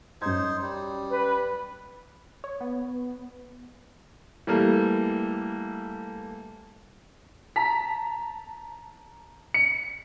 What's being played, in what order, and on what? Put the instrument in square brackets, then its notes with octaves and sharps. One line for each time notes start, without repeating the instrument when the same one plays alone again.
[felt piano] F#2 G#6 [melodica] D#4 C5
[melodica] G3
[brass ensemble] B4
[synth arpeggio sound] C#5
B3
[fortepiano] E3 G3 A3 A#3
[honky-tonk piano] A5 A#5 B6
C#7